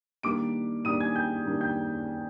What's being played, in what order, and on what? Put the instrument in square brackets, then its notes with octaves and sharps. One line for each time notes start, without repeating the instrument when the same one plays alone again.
[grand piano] D#3 G3 A#3 D4 D6 D7
D#3 G3 A#3 D4 D#6 D#7
G#5 G#6
G5 G6
D#3 G3 A#3 D4
G5 G6